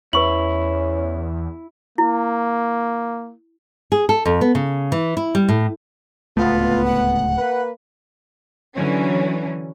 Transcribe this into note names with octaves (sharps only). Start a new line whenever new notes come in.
E2 C#4 E4 B4 C#6 F#7
A#3 E4
G#4
A4
F2
B3
C#3
E3
E4
G3
A2
D1 C#2 A3 B3 F4
F#5
A#3 B4
D3 E3 F#3 C#4